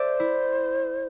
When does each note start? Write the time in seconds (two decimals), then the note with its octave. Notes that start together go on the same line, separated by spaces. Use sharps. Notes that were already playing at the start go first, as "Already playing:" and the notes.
Already playing: A4 C5 D5 E5
0.20 E4